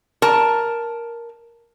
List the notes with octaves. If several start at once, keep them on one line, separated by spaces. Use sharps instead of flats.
A#4 A5